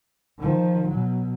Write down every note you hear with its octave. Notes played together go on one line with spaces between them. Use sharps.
D#3 F3
B2 F#3